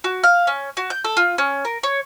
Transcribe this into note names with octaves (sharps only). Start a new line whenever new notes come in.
F#4
F5
C#4
F#4
G6
A4
F4
C#4
A#4
C#5